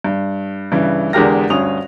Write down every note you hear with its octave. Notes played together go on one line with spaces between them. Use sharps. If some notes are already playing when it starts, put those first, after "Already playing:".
G2
G2 C#3 E3
E2 D3 G#3 G4 A#4 A#6
D2 G2 C#4 D#6 F7